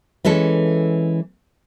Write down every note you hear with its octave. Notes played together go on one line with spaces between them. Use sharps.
E3 G#3 C#4 A4